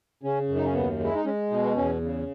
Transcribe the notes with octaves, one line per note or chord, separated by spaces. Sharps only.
C#3 C#4
F#2
D#4
C#4
D#2 B3
G#3
E4
D#4
G#3 C#4
B2 D#4
B3
E2 C#4
C#3